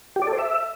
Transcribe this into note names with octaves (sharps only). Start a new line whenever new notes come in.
G4
D5
A4
C5
E5